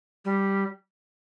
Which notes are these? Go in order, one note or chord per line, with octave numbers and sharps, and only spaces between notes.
G3